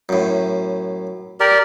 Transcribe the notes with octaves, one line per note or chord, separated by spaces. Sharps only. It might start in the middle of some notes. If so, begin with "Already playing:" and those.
F#2 A2
G4 A#4 D5